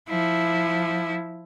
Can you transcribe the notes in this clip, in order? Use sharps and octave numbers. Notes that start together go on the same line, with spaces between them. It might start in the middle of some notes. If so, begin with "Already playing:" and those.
F3 E4